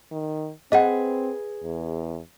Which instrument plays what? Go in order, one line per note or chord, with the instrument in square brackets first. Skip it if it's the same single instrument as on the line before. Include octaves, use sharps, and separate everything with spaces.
[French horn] D#3
[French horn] C4 [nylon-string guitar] G#4 B4 [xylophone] D#5 F#5
[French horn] E2